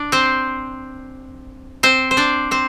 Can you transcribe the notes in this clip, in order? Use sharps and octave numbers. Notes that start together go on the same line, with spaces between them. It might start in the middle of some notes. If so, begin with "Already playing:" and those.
Already playing: D4 D5
C4 C5
C4 C5
C5
D4 D5
C4 C5